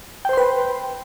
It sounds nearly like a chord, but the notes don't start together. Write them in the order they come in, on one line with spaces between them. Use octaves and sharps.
G5 C5 C6 B4